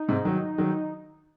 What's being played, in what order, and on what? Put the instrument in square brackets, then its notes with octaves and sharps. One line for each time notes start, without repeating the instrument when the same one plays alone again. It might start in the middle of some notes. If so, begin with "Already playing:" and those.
Already playing: [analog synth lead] D#4
[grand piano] G#2 C3
D#3 F#3
D#3 F#3